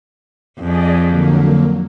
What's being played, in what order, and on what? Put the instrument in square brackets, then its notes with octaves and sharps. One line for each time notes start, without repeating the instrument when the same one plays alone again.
[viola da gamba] F2 [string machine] G#4 D5 D#5
[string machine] D3 F#3 A#3